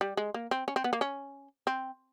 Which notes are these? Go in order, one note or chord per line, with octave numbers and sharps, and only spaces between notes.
G3
G#3
A#3
C4
C#4
C4
B3
A#3
C#4
C4